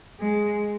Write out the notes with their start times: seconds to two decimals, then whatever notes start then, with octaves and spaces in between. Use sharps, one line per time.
0.21 G#3